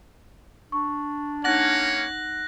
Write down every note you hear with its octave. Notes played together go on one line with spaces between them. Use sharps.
D4 C#6
A#3 C#4 D#4 C#5 F#5 F#6 A#6 F#7